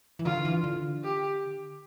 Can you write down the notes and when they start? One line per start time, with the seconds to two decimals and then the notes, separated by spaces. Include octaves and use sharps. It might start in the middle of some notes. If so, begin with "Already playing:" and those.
0.19 E3
0.25 D3 F4
0.45 E3
0.64 D3
1.03 G4